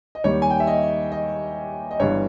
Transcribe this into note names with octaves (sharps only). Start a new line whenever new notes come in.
D#5
D#2 D#3 G3 C#5
G#5
G5
E5
D#5
D#5
D#5
G1 G2 E3 C#5